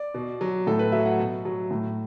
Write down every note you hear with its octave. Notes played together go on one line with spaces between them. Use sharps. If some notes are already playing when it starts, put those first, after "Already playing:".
Already playing: D5
B2
F#3
A2 A4
B4
F#3 E5
F#5
B2
F#3
A2